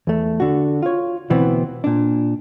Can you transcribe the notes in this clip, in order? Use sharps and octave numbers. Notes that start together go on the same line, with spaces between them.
E2 A3
D3 F#4
F4 C#5
D2 B2 E3 B3 C4
A#2 D4